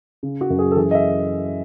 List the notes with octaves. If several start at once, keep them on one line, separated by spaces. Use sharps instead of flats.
C#3
F#4
F#2
G#4
A4
E3 G#4
D#5
E5